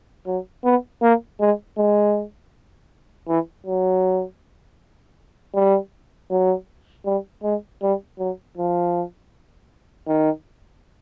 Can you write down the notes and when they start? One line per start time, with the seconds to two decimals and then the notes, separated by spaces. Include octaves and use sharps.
0.26 F#3
0.64 B3
1.02 A#3
1.40 G#3
1.78 G#3
3.28 E3
3.66 F#3
5.54 G3
6.31 F#3
7.05 G3
7.43 G#3
7.82 G3
8.19 F#3
8.57 F3
10.07 D#3